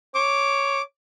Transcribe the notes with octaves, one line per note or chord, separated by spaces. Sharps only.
C#5 D6